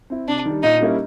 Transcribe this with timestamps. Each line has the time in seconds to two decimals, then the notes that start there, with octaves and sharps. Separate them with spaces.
0.10 C4 E4
0.28 C3 D4
0.45 D#3 G3
0.63 A#2 D#4
0.81 G3 A#3 C#4 E4